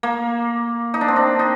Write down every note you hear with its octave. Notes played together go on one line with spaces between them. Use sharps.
A#3
D#4
D4
C4
D4
D#4